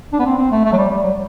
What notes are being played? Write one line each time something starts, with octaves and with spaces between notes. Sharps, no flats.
D4
B3
C4
C4
A3
A3
F#3
G3
G3
F#3